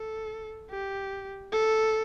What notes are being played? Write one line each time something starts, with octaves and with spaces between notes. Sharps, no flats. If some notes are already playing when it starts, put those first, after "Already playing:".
Already playing: A4
G4
A4